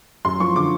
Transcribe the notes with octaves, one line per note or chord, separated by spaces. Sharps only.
F#2 C6
F3 C#6
D3 D6